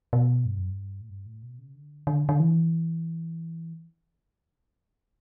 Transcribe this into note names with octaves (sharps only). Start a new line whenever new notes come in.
B2
G2
F#2
G2
A2
G2
A2
B2
C#3
D3
D3
D3
E3